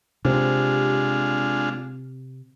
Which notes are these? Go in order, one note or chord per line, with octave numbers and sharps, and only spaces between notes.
C3 G#3 D4 F4